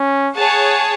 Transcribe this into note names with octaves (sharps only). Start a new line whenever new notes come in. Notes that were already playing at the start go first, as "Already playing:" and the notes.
Already playing: C#4
G#4 C#5 F#5 A5